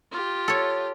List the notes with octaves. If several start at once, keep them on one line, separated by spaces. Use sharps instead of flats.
F4 G4
A4 C#5